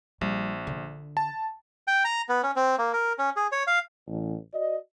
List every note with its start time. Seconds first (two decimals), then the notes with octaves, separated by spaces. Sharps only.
0.21 A#1 G3
0.67 D3
1.17 A5
1.87 G5
2.05 A#5
2.29 B3
2.43 C#4
2.56 C4
2.78 A#3
2.93 A#4
3.19 C#4
3.36 G#4
3.52 C#5
3.67 F5
4.07 A1
4.53 F#4 D5 D#5